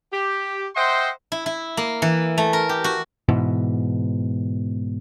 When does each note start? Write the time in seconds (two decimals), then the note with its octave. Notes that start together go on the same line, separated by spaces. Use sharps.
0.13 G4
0.76 C5 D#5 E5 F#5 G5 C6
1.32 E4
1.46 E4
1.77 A#3
2.02 E3
2.38 A3
2.53 A#4
2.69 G4
2.84 F#4
3.29 G#2 B2 E3